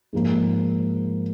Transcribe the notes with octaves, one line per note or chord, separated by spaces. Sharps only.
G#2 F3 A#3